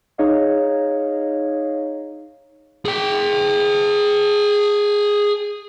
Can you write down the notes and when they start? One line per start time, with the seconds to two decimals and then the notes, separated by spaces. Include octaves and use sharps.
0.18 D#4 G#4 C#5 D#5 F5
2.85 G#4 G5